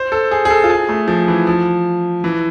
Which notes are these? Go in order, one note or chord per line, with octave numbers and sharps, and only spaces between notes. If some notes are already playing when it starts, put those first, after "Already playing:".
Already playing: C5
A4
G#4
G#4
A4
F4
G#4
A3
F3
E3
F3
E3